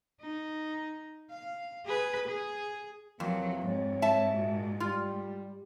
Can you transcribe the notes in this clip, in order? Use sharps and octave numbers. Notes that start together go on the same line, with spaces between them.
D#4
F5
G#4 B4
G#4
F2 C3 E3 F#3 A#3
G#2 G3 C4 C#5
E5 A5
A#2 F#4
G3 F4